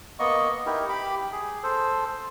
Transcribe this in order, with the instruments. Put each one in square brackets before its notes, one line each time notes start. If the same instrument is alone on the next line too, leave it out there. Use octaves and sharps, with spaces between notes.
[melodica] A#3 B3 D#5 C#6
D#4 E4 G4 A#4
G4 B5 D6
G#4
A4 C5